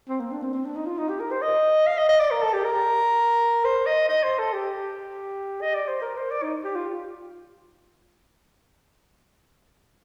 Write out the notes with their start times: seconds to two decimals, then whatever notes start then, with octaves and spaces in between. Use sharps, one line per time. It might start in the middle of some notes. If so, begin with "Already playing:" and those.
0.09 C4
0.20 A#3
0.31 D4
0.42 C4
0.53 C4
0.65 D4
0.76 D#4
0.86 F4
0.98 D#4
1.09 G4
1.20 A#4
1.31 C5
1.42 D#5
1.87 F5
1.98 D#5
2.09 D#5
2.20 D5
2.31 A#4
2.42 A4
2.54 G4
2.65 A#4
3.64 C5
3.87 D#5
4.09 D#5
4.24 C5
4.39 A4
4.53 G4
5.62 D#5
5.75 D5
5.88 C5
6.02 A#4
6.17 C5
6.31 D5
6.42 D#4
6.64 G4
6.75 F4